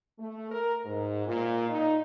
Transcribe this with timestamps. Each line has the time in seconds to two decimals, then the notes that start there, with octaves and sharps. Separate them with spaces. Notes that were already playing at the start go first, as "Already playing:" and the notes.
0.19 A3
0.49 A#4
0.85 G#2
1.26 A#2
1.69 D#4